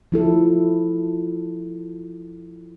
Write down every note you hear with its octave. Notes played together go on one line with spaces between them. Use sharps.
F3 E4 A4